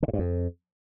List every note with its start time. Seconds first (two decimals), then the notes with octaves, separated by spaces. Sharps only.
0.03 D3
0.08 A2
0.13 G2
0.19 F2